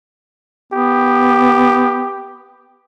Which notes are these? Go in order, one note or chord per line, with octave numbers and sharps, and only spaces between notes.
B3 G4